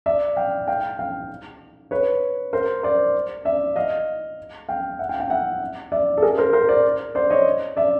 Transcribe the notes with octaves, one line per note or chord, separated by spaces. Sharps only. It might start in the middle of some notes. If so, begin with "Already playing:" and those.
D5 E5
F5 G5
F5 G5
F5 G5
B4 C#5
A#4 C5
C5 D5
D5 E5
D#5 F5
F5 G5
E5 F#5
F5 G5
F5 G5
E5 F#5
D5 E5
A4
G#4 A#4
A#4 C5
A#4 C5
C5 D5
C5 D5
C#5 D#5
D5 E5